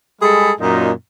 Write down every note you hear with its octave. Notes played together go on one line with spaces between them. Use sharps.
G3 G#3 G#4 A4 B5
F#2 A#2 D#4